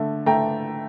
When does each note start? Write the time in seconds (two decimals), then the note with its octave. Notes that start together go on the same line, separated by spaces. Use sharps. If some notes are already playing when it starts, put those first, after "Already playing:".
Already playing: D3 A3
0.26 A3 G5 A#5